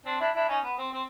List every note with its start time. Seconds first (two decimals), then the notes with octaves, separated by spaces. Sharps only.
0.06 C4 D4
0.20 D4 E4
0.35 D4 E4
0.48 C#4 D#4
0.64 B3
0.78 C4
0.92 C4